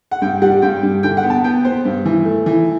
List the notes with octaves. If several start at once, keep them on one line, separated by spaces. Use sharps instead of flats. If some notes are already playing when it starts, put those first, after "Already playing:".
F#5
G2 G5
G3 F#5
G2 G5
G2
D3 G5
F#5
B3
A5
B3 G5
B3 C5
G2
E3
A3
E3